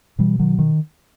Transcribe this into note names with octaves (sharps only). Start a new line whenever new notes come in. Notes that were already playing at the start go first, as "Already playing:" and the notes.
B2 E3 G3
D#3 F#3
D#3